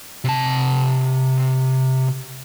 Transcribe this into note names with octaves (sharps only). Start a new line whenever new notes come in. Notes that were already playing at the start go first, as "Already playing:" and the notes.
C3 A5